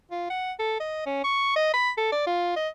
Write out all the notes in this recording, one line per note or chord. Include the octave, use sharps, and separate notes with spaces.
F4
F#5
A4
D#5
C#4
C#6
D#5
B5
A4
D5
F4
D#5